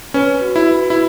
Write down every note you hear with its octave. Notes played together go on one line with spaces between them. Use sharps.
C#4 B4
F#4
E4
B4
E4